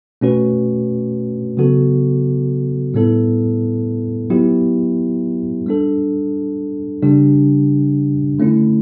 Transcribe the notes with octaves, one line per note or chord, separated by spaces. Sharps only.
B2 A3 C#4 F#4 B4
C#3 F#3 B3 F#4 A4
A2 G3 B3 E4 A4
F#3 B3 E4 G4
G3 D4 A4
C#3 G3 D4 G4
D3 A3 C#4 E4